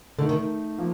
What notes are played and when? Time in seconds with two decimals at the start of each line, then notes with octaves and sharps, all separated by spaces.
0.19 D3 A3 D#4 A#4
0.29 D#3
0.78 F3 A#3